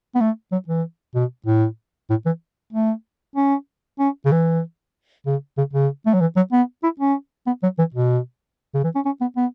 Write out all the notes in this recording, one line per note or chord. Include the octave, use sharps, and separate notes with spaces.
B3
A3
F#3
E3
B2
A2
A2
E3
A3
C#4
C#4
C#3
E3
C#3
C#3
C#3
A3
F#3
E3
F#3
B3
E4
C#4
B3
F#3
E3
B2
C#3
E3
C#4
C#4
B3
B3